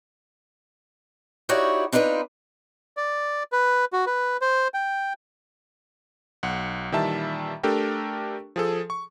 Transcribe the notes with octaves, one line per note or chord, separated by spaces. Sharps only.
D#4 E4 F#4 G4 C#5 D5
C4 D4 D#4 F4 B4 C5
D5
B4
F#4
B4
C5
G5
B1 F#5
A#2 D#3 E3 G3 E5 A5
A3 D4 G4 A4 A#4 G5
F3 G#4 A4
C#6